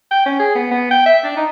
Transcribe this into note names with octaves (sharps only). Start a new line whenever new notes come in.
G5
C#4
G#4
B3
B3
G5
E5
D4
D#4